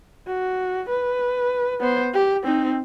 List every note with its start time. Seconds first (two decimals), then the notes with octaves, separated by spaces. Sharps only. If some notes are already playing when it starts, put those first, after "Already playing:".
0.27 F#4
0.89 B4
1.80 B3 C5
2.14 G4
2.44 C4 D#4